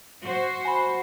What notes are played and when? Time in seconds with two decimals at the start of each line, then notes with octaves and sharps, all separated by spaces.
0.22 F#4 C5
0.65 G#5 B5